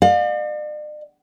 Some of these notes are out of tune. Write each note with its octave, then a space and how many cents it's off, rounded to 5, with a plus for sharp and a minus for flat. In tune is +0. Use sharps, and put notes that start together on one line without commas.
D5 +45 F5 +35